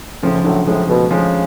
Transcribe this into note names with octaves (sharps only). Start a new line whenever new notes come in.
A2 C#3 F3
F3
A2 D3 F#3
A2 F3 G#3
B2 F#3 A3
C#3 F3 G#3